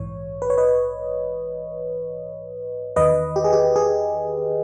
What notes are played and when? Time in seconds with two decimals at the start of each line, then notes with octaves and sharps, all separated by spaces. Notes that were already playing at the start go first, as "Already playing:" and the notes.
Already playing: A#1 G#2 E3 C#5
0.42 B4
0.50 C#5
0.58 B4 D#5
2.96 E2 D#3 B4 D#5
3.36 G4
3.44 G#4
3.53 G4
3.76 G#4